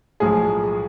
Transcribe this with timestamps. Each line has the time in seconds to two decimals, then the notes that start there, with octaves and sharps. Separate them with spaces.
0.20 B1 A2 F3 G#3 G#4